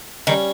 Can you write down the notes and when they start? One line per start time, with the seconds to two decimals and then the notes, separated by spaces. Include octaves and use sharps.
0.27 D#3 G3 C#4